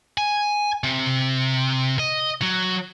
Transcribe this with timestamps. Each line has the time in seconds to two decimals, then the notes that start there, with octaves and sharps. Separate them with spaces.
0.18 G#5
0.84 C3
1.99 D#5
2.42 F#3